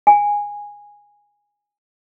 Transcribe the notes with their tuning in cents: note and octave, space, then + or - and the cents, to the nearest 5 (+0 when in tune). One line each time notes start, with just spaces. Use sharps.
G#5 -10